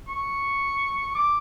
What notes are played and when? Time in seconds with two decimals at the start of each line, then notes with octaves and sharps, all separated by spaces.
0.08 C#6
1.15 D6